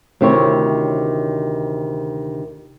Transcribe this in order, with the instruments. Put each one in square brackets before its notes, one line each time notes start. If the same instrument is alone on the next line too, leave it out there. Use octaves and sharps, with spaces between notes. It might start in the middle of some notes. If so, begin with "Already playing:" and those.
[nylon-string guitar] D2 C3 D#3 C4 E4 C#5